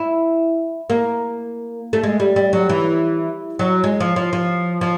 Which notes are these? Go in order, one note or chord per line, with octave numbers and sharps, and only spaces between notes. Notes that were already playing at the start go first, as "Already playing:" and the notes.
Already playing: E4
A#3
A3
G#3
G3
G3
F#3
E3
F#3
G#3
F3
F3
F3
F3